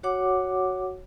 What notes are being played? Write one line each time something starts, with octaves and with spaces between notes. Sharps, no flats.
F#4 C#5 F#5 D6